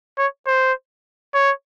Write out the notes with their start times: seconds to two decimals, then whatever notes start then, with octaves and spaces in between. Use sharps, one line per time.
0.18 C#5
0.47 C5
1.34 C#5